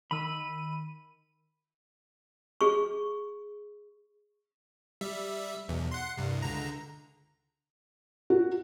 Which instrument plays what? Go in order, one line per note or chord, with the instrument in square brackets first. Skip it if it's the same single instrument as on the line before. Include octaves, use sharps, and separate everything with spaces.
[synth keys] D#3 D#7 [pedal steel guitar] B5 E6
[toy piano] G#4 C#6
[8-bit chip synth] G3 E5
B1 E2
F#5 C6
C2 G2
C#2 D3 A#5
[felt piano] F#4